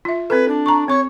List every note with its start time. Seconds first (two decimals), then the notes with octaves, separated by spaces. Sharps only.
0.05 F4 E5
0.30 C4 A4 B4
0.48 D4
0.66 A#5 C#6
0.88 C4 C#5 C#6